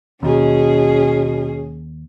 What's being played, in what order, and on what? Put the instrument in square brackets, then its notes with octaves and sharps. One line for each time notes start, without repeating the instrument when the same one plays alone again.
[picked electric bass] D#2 [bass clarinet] B2 [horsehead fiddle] C#4 G#4